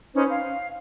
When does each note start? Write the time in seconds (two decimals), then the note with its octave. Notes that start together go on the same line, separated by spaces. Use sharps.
0.15 C#4 D#4 B4 C5
0.29 F5